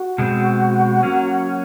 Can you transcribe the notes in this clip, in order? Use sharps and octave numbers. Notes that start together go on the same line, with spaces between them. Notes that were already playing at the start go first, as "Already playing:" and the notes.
Already playing: F#4
B2 G#3 C4
F#3 A#3 C#4